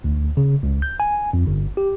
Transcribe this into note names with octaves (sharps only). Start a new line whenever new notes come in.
D2
C#3
C#2
G6
G#5
F2
G1
G4